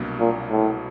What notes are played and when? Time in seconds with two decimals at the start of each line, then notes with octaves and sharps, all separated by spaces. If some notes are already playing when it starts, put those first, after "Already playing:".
Already playing: C2 B2 F#3 A#3 D4
0.20 A#2
0.51 A2